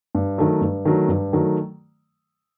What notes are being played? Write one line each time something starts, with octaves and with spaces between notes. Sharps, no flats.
G2
D#3 F#3 A3
G2
D#3 F#3 A3
G2
D#3 F#3 A3